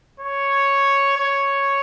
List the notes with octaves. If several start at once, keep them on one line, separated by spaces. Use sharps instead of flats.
C#5
C#5